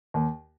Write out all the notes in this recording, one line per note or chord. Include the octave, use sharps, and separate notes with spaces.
D#2